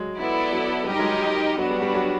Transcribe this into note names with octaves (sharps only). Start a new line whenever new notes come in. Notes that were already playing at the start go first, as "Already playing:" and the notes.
Already playing: F#3 G#3
B3 E4 A4 D5
F#3
F#3
G3 D#4 G4 A#4 D#5
F#3 G#3
F#3 B3 D4 F#4
G3
G3
F#3